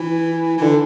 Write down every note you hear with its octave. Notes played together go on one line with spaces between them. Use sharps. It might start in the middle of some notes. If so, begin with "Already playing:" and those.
Already playing: E3
E3
D3